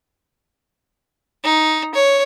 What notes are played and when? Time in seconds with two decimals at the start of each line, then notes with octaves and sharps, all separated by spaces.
1.44 D#4
1.94 C#5